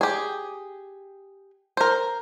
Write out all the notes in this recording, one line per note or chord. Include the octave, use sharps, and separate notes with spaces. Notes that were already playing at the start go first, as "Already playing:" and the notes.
G4 G#4
A#4 C5